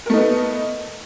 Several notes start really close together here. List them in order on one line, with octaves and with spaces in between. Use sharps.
A#4 A3 D#4 B3